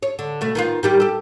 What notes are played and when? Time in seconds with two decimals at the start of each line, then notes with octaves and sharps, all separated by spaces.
0.03 C#5
0.19 D3
0.41 B2 A3
0.55 D#3 B3 F4
0.83 D#3 G3 G4
1.00 G4 A4